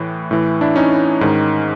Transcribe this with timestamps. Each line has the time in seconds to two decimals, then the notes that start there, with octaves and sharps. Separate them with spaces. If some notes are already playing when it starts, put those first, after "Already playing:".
Already playing: A2 E3
0.31 A2 E3
0.61 D4 E4
0.76 C#4 D#4
1.21 G#2 D#3